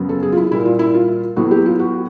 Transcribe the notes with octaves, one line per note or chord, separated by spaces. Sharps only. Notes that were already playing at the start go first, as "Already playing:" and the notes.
Already playing: F#2 C#3 F#3 B3
A4
G#4
F4
E4
A#2 G3 A#3 E4
F4
E4
F4
A2 F#3 B3 F#4
G4
F4
F#4